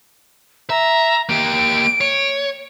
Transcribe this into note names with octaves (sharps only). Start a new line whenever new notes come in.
E5 A#5
A#3 G4 D7
C#5